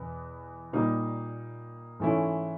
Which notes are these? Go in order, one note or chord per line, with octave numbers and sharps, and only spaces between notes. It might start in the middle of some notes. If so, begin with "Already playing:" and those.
Already playing: E2 B2 B3
A#2 G3 A#3 D#4
G#2 E3 A3 C#4 E4